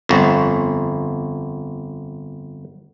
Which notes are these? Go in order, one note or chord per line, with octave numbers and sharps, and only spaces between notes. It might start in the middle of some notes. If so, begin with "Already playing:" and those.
G1 F2